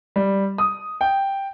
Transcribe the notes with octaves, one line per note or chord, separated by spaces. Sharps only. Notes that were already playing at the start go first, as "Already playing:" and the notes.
G3
D#6
G5